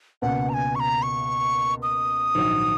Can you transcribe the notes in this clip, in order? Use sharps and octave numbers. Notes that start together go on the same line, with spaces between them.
C#2 B2 A#3 F#5
A#5
G#5
C#6
A#5
C#6
D#6
A#1 G#2 D#3 F#3